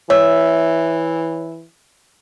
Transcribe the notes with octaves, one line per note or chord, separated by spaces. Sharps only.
E3 C#5 E5